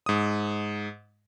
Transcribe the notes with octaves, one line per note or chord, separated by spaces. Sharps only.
G#2 D#6